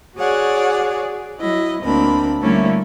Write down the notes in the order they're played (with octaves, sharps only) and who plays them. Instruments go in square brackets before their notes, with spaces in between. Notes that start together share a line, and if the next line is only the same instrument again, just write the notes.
[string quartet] F#4 G#4 C#5 D5 F#5
F#3 E4 D#5
D2 A#3 C4 D4 B5
D3 G3 A3 A#3 C#4 E4